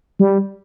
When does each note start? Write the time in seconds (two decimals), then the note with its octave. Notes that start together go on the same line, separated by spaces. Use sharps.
0.19 G3